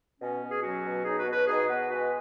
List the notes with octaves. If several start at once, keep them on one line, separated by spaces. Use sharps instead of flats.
B2 C#4
B2
G#4
F#3 C#4 F#4
B2
F#3 D#4 G#4
F#4 B4
B2
F#4 B4
B2 D#4 G#4
B2 F#4 B4
G#3 F#4 B4